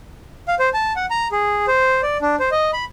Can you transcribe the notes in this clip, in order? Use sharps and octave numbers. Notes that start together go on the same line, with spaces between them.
F5
C5
A5
F#5
A#5
G#4
C5
D5
D4
C5
D#5
B5